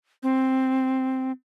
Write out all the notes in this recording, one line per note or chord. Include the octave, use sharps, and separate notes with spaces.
C4